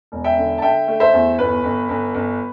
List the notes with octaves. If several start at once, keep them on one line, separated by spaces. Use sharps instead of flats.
E1
E5 G5
D3
A5
D3 E5 G5
A3
C5 E5
E2
G1 B4
G1
G1
G1